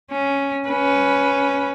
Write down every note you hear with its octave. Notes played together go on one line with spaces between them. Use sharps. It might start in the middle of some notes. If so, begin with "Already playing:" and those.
C#4
C#4 B4